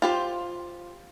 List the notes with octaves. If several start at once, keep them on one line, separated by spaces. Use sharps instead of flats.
F4 G4 C5